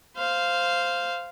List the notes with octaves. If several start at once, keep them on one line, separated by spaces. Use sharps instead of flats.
C5 F5